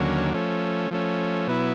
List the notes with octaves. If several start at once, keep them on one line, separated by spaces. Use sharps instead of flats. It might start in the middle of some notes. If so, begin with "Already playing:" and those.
Already playing: D#2 D3 F#3 A#3 C#4
F3 A3 C#4
F3 A3 C#4
B2 F#3 B3 E4